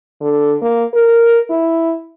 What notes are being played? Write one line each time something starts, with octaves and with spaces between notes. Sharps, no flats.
D3
A#3
A#4
E4